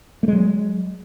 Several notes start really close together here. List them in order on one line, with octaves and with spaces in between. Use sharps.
A3 G#3 F#3